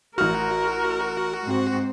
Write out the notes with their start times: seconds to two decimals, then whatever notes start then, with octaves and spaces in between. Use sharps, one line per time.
0.18 A1 F#4 A#4 F6
1.44 G#2 C4